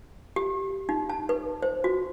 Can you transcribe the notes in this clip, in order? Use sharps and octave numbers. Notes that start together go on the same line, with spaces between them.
G4
D#4
A5
B4
C5
F#4